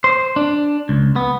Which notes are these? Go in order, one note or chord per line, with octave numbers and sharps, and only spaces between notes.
C5
D4
C#2
B3